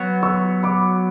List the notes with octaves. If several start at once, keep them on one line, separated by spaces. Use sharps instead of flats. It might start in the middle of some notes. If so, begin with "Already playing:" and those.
Already playing: F#3 B3 F#4 C#5
C#6 E6
B5 D6